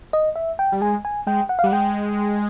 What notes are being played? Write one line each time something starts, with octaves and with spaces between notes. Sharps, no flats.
D#5
E5
G5
G3
G#3 G#5
G#5
G#3 G5
F#5
F5
G3 F#5
G#3 G5